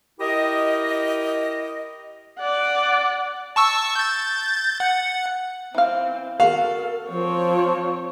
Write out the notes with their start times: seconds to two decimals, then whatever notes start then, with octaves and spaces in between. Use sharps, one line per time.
0.19 E4 G4 A#4 D#5
2.39 D5 F#5
3.56 A5 C#6 E6
3.95 G6 A6
4.80 F#5
5.75 E3 C4 F5
6.40 F#4 A4 A#4 F5
7.09 F3 C4 C#5